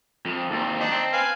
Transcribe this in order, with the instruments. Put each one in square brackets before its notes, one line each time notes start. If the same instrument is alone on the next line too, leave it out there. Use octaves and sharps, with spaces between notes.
[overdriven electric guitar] F2
D#2 C4
[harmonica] D4 D#4
[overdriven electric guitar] C4
[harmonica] B4 F5 G#5